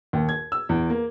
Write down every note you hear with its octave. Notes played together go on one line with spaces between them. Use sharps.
D#2
G#6
E6
E2
A#3